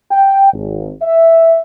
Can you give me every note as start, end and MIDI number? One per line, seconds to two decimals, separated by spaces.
0.11 0.51 79
0.53 0.90 32
1.02 1.61 76